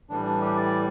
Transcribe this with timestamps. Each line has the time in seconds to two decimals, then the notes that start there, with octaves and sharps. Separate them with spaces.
0.10 A2 E3 G3 D4
0.25 D4
0.41 G4
0.57 D5